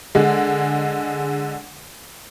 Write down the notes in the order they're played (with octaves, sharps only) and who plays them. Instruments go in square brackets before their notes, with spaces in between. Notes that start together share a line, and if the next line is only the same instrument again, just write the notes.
[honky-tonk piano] D3 G#3